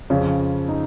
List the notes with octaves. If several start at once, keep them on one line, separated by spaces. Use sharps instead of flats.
F2 C#3 F3 C#4
D#4